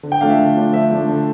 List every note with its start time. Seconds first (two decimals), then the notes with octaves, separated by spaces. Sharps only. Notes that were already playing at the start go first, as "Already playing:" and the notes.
0.03 D3
0.12 G5
0.21 F3 A3 D4 F5
0.30 E5
0.38 D3
0.55 F3 A3 D4
0.73 D3 E5
0.91 F3 A3 D4
1.08 D3